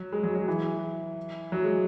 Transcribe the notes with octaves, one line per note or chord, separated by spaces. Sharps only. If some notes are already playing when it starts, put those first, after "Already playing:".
Already playing: F#3
G#3
F#3
F#3
E3
F#3
G#3